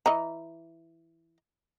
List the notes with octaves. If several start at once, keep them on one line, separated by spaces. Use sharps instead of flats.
E3 D#5 A#5